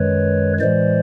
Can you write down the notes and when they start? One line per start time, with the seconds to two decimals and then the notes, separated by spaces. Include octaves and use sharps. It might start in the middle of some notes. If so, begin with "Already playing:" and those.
Already playing: F#2 D#3 G#3 B4 C#5
0.60 A2 E3 G#3 C5 D5